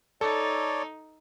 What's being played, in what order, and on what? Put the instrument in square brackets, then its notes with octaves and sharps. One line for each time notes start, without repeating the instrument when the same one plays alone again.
[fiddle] D#4 [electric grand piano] A4 [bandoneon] C#5 D5